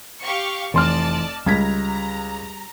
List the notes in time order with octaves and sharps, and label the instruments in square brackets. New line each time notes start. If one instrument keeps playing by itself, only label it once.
[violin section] G4 F5 C#6
[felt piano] F1 C6 F6 [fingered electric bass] E3 [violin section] D5 D#5 A5
[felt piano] C#2 G#6 B6 [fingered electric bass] G3 [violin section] A#5